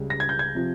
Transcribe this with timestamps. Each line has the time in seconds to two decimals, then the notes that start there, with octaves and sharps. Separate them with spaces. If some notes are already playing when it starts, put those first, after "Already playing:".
Already playing: C#2 C#3 G3
0.10 A#6
0.20 G#6
0.29 G6
0.39 G#6
0.55 C3 F3